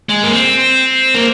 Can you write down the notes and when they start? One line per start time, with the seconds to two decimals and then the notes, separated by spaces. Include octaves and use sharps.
0.09 G#3
0.23 A#3
0.32 C4
1.14 A#3